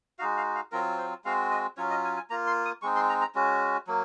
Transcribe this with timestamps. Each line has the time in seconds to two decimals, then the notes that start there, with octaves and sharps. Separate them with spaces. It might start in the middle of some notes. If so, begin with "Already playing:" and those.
0.19 G#3 D#4 F#4 F5
0.37 F5
0.55 F5
0.72 F#3 C4 F4 A#4
0.98 C5
1.25 G#3 C4 F#4 F5
1.51 D#5
1.77 F#3 C#4 F4 C#5
1.90 D#5
2.04 G#5
2.17 G#5
2.30 A#3 F4 A#5
2.47 C6
2.65 D#6
2.82 G#3 C4 D#4 C#6
2.96 C6
3.09 A#5
3.21 A#5
3.35 G#3 C#4 F#4
3.87 F#3 A#3